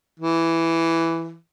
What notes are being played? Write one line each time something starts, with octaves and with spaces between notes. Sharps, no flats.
E3